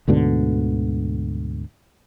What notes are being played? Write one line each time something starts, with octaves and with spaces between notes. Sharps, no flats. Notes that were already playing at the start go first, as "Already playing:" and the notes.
D2 G#2 B2 D3